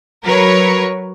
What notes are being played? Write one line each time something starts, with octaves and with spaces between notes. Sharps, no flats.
F#3 A#4 B4 C#5